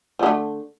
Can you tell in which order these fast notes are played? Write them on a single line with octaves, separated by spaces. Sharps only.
F3 D3 A3